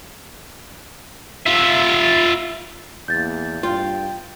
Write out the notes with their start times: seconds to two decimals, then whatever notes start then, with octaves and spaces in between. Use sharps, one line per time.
1.46 F4 E5
3.08 E2 A#3 G6 A6
3.63 G2 F4 G5